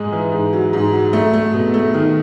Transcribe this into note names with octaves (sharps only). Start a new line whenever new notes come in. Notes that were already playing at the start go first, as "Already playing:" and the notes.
Already playing: G#2 G#3 D#4
E3
G#2
F#3
G#2
F#3
A3
A3
B2
A3
D#3